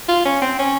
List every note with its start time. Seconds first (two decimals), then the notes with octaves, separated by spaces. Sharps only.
0.08 F4
0.25 C#4
0.42 C4
0.59 C#4